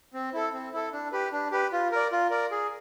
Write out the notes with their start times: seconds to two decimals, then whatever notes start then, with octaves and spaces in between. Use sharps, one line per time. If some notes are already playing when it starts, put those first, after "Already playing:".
0.14 C4
0.33 E4 A4
0.53 C4
0.72 E4 A4
0.92 D4
1.12 G4 B4
1.32 D4
1.51 G4 B4
1.72 F4
1.91 A#4 D5
2.12 F4
2.30 A#4 D5
2.51 G#4